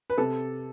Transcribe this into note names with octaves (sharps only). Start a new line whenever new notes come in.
B4
C3 A4